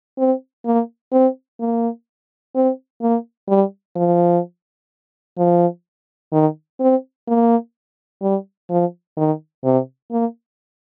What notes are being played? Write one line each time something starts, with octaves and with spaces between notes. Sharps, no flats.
C4
A#3
C4
A#3
C4
A#3
G3
F3
F3
D#3
C4
A#3
G3
F3
D#3
C3
A#3